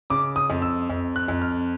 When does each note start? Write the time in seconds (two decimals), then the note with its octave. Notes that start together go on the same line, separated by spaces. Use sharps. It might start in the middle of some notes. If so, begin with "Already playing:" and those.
0.10 C#3 D6
0.36 D#6
0.50 F2
0.62 E6
0.90 F2
1.16 F#6
1.28 F2
1.42 F6